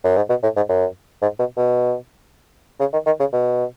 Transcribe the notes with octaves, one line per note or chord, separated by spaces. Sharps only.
F#2
G#2
B2
A2
G#2
F#2
G#2
B2
B2
C#3
D#3
D#3
C#3
B2